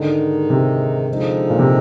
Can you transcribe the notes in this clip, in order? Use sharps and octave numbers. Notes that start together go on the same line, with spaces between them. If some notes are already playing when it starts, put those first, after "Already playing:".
Already playing: G#2 D3 D#3 G#3 D#4
C3
D3 F3 G#3 D#4
A#2
C3